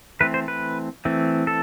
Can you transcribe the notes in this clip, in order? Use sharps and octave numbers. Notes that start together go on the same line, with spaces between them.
E3 A3 C4 B4
C5
B4
E3 A3 C4
A4